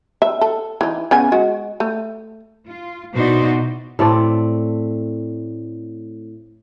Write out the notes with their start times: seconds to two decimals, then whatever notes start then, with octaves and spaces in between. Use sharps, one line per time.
0.22 E5
0.41 A4
0.81 E3 D#4
1.11 C#3 B3 G#5
1.32 G#3 F#4
1.80 A3
2.67 F4
3.14 B2 D#4 E4 F#4 C5 D5
3.99 A2 A3 C4 D5